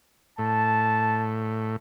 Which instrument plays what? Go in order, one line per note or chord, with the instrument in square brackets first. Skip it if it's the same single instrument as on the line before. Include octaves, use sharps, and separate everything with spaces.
[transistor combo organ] A2 [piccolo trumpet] A5